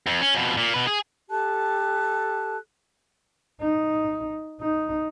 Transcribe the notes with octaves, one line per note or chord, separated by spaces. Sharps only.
F2
C#4
F2 B2
A#2
B2 B4
G#4
G4 A4 A5 F#6
D#4
D#4